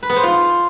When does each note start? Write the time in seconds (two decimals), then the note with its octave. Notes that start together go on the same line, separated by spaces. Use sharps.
0.03 B4
0.09 B3
0.16 C5
0.23 F4